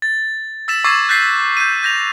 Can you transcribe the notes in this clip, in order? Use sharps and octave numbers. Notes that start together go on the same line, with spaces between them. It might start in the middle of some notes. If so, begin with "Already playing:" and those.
A6
E6 A6 B6 E7
C#6 D6 E6 G#6 A6 C7
F#6 G6 A6 B6 C7
G6 D#7
G6 A#6 F7